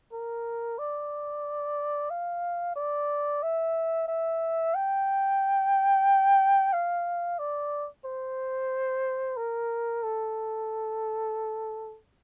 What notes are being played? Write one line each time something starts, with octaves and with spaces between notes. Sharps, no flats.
A#4
D5
F5
D5
E5
E5
G5
F5
D5
C5
A#4
A4